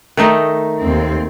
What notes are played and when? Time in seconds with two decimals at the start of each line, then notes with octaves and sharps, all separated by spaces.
0.17 D#3 A3 D#4
0.79 D#2 C4